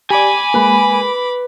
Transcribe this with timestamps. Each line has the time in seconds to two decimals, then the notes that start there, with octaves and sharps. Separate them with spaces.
0.10 G4 D5 G#5 B5 D6
0.54 G#3 A#3 B4